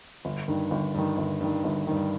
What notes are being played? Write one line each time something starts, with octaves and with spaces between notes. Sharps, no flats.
G1
G2 D#3
G1
G2 D#3
G1
G2 D#3
G1
G2 D#3